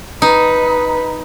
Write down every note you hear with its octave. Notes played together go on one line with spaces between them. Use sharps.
D#4 B4